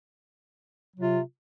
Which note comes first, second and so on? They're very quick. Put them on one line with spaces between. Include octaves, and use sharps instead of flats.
F#3 C3 F4